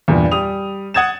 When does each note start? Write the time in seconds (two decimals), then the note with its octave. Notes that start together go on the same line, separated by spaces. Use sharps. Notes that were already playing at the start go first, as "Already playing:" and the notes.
0.08 E2 G2 A#2
0.31 G3 D#6 F7
0.94 F#5 D#6 G#6 A6 E7